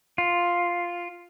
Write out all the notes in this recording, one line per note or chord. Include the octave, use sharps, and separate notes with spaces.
F4